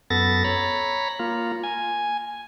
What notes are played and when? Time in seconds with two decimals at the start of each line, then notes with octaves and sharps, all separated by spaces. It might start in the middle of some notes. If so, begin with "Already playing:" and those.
0.10 F#2 B3 A4 A6 A#6
0.44 C#5 A#5 B5
1.19 A#3 F4
1.64 G#5